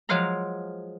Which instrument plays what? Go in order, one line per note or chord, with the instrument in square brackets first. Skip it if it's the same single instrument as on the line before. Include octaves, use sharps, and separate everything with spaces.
[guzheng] F3 F#3 G#3 C5 F5 A#5